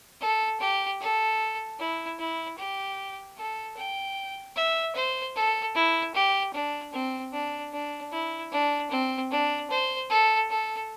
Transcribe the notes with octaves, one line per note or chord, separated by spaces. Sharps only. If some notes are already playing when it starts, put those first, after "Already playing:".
A4
G4
A4
E4
E4
G4
A4
G5
E5
C5
A4
E4
G4
D4
C4
D4
D4
E4
D4
C4
D4
C5
A4
A4